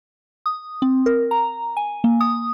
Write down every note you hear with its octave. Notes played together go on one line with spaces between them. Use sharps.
D#6
C4
A#4
A#5
G#5
A#3
D#6